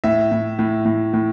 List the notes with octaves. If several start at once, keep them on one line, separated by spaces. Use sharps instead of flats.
A2 E5
A2
A2
A2
A2